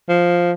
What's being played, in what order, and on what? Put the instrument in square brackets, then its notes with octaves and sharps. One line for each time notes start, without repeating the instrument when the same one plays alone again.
[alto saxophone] F3